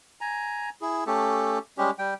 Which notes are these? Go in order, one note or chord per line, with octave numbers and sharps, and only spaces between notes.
G#5 A#5
E4 G#4
A3 C#4 G4 A4
G3 G#3 C#4 G4
G3 G5